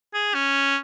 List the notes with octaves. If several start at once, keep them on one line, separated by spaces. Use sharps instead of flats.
G#4
C#4